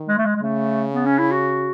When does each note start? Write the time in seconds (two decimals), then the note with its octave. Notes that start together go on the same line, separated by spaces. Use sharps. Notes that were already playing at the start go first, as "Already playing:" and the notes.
Already playing: D#3
0.09 G#3
0.18 A3
0.26 G#3
0.36 G#3
0.42 C#3 A3
0.94 B3
1.06 C#4
1.19 E4
1.32 F#4